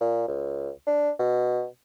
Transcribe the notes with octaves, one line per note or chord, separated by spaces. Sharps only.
A#2
C#2
D4
B2